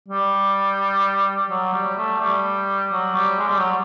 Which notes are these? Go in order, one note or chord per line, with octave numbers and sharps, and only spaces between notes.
G3
F#3
G3
A3
G3
F#3
G3
G#3
G3
F#3